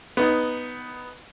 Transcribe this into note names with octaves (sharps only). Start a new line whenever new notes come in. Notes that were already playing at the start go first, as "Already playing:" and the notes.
B3 D#4